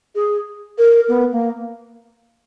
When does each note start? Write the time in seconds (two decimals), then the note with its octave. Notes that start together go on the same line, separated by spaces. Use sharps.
0.15 G#4
0.78 A#4
1.08 B3
1.32 A#3